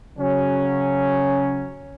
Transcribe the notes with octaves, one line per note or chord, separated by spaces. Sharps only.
C#3 F#3 C#4